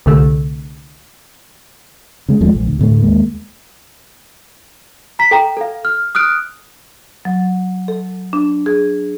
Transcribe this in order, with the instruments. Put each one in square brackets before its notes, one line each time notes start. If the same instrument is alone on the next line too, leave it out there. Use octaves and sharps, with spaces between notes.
[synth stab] C2 D3 A3
[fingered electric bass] C#3 G#3
D#2 F3 G#3 A3
A#1
D2
D2 A2 G#3 A3
D#2 G#3 A#3
[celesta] A#5 B6
A4 G5 A#5
A4 F5
F6
D#6 F6 F#6 D7
[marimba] F#3
A4
D4
G#4